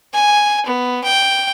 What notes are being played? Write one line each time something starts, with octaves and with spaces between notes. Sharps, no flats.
G#5
B3
G5